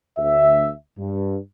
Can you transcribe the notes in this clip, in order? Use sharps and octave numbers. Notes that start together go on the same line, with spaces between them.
D2 E5
G2